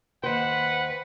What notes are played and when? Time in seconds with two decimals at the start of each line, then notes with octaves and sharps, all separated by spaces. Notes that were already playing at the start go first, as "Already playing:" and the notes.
0.23 D#2 B4 C5 F#5